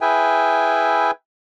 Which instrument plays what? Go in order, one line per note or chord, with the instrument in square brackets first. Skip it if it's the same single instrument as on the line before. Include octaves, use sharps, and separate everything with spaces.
[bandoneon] E4 G#4 B4 E5 G5 G#5